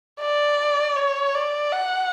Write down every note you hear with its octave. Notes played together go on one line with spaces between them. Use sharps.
D5
C#5
D5
F#5